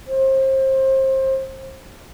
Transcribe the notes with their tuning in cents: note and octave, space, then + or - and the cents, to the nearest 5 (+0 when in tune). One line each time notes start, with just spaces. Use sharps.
C5 +30